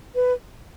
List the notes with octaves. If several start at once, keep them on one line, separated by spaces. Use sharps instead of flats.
B4